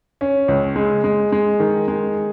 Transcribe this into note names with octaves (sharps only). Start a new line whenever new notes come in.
C#4
C#2
G#3
G#3
G#3
D#3
G#3